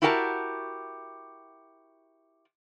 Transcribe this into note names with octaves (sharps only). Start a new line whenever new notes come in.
E4 F#4 G4 A#4 G5 A5